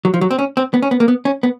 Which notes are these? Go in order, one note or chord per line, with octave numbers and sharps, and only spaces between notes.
F#3
F3
F#3
C4
C#4
C4
B3
C#4
B3
A#3
B3
C#4
B3